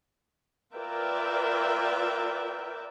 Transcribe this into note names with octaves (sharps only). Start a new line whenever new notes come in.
F4 A#4 B4 D5 E5 G5